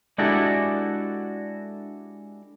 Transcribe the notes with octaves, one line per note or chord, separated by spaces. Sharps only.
G#3 D4 E4 F#4 G4 A4